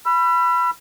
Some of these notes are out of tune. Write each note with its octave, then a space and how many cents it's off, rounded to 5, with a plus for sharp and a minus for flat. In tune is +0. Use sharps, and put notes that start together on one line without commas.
B5 +0 E6 +45